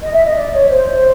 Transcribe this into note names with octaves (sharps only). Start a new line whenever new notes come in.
D#5
E5
D#5
D5
C#5
C5